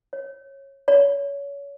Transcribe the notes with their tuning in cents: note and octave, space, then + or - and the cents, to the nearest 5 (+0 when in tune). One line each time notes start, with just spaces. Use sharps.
C#5 -20
C#5 +25